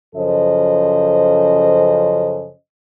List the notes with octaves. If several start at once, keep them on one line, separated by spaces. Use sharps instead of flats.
F#2 C#3 F3 A4 C5 D#5